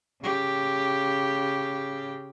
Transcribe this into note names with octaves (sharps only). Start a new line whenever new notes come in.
C#3 G4